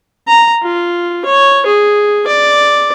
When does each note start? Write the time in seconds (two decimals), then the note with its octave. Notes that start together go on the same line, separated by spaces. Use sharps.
0.28 A#5
0.63 F4
1.25 C#5
1.66 G#4
2.27 D5